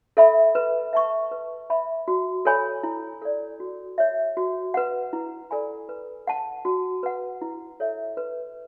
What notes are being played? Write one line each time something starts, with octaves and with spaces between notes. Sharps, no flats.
A4 E5 B5
B4
E5 A5 C#6
B4
E5 B5
F#4
A4 C#5 G#5 B5
E4
A4 D5
F#4
C#5 E5
F#4
B4 F#5
E4
A4 D5 G#5 B5
B4
F#5 A5
F#4
B4 F#5
E4
A4 C#5 E5
B4